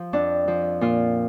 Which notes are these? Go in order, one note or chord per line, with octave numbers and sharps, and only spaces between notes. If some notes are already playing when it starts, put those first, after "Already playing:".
Already playing: F3
F2 D4
F3
A#2 F4